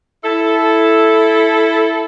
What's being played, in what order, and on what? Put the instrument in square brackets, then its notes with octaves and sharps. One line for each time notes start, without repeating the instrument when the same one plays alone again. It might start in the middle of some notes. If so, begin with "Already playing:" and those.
[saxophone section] E4 A4